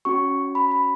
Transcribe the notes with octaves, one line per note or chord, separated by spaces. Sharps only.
C#4 F#4 C#6
B5
B5